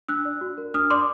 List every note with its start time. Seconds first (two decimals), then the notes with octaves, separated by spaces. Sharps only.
0.09 D4 E6 F#6
0.25 D5
0.41 F#4
0.58 A#4
0.74 D4 D#6 F6
0.90 D5 C6 D6